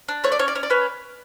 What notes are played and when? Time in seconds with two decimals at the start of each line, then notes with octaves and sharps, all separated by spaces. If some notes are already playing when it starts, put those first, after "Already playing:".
0.08 D4
0.24 A3 C#5
0.32 D5
0.39 C#4 C#5
0.48 D5
0.55 C#4 C#5
0.63 D5
0.70 C#4 B4 C#5